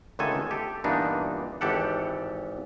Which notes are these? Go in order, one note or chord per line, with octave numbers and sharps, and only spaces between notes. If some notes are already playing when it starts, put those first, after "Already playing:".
C#2 D3 D#3 A3 A4 G#5
G4 A4
G2 A#2 E3 B3 D4 D#4
G#1 E3 G4 A4 F#5